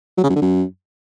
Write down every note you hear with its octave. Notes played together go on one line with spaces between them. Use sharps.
F#3
C#3
F#2
D3
F#2